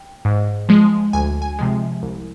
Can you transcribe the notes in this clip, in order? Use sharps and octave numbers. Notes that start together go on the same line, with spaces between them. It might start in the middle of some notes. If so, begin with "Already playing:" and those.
Already playing: G5
G#2
F3 G#3
D2 G#5
G#5
C3 F3 G#3
C2